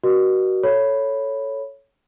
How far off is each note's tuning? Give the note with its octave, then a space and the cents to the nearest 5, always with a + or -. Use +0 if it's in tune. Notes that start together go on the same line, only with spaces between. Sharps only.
F#4 +25 A#4 +40 D#5 -40
A4 +0 C#5 +0 B5 +0